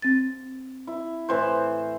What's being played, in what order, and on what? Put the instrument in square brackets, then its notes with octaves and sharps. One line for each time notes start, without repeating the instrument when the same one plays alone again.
[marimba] C4 A6
[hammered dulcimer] E4
A2 E3 C5